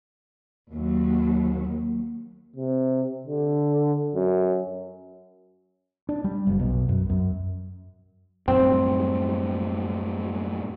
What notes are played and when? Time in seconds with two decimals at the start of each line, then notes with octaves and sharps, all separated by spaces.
0.72 D#2 F#3
2.56 C3
3.27 D3
4.15 F#2
6.09 D4
6.24 G3
6.47 F#1
6.59 B1
6.89 F#2
7.10 F#2
8.48 F#2 A2 G3 C4